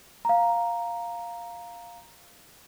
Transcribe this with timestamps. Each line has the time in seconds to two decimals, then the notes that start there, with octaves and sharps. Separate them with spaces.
0.25 F5 A#5